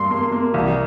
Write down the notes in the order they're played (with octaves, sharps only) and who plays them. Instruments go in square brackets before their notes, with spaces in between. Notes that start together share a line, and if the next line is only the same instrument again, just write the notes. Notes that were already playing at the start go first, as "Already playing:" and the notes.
Already playing: [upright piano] G2 A#3 [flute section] C6
[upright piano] A#3
A#3
C2